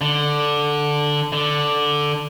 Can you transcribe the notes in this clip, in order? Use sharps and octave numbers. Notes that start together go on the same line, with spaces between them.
D3
D3